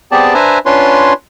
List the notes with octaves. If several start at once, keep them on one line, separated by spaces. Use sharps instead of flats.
B3 C4 G4 G#4 D5 A5
D4 B4 C5 E5 G#5 A#5
C#4 D4 F4 B4 C#5 C6